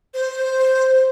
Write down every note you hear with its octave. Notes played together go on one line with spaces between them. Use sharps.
C5